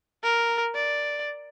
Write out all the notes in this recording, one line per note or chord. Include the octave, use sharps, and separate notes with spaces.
A#4
D5